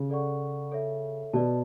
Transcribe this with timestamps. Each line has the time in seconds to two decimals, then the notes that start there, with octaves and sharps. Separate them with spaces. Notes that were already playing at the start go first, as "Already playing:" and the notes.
Already playing: C#3
0.10 A4 D5 F#5 C#6
0.72 A4 C#5 E5
1.33 B2 B4 D5 A5